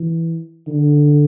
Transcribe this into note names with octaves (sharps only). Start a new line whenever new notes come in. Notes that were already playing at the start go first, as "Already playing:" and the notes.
Already playing: E3
D3